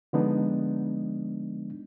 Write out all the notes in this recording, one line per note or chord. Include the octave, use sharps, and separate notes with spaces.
D3 F3 G#3 B3 D4 D#4